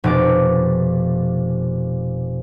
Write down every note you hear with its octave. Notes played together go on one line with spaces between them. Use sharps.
F1 B2 D6